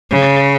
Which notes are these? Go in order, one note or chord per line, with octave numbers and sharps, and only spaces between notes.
C#3